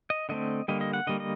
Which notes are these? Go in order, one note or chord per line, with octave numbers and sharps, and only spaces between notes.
D#5
D3 A3 C4 D#5
D3 G3 A#3 D#5
D#5
F#5
D3 G3 A#3 D#5
D#5